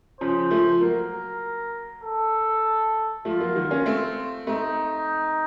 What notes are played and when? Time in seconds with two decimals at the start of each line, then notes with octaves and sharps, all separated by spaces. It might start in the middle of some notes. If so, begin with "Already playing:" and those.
0.20 C#3 F3 C5
0.51 F3 A3
0.81 F#3 A#3 A#4
2.04 A4
3.25 F3 A3 F4
3.40 F#3 A#3
3.56 D#3 F#3
3.71 A#3 C#4
3.86 A3 C4
4.47 A3 C4 D#4